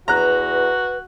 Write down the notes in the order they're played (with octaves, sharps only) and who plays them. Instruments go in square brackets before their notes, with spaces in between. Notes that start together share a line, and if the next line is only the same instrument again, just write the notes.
[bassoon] E2 [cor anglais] F#4 [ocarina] B4 [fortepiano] A#5 F#6